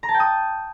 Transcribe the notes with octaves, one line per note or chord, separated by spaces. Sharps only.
A#5
A5
G5
D#6